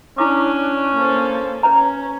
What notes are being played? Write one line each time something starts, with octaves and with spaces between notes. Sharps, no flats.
C#4 D4 E4 D6
A#3 A4 C5
C#4 B4 C#5 A#5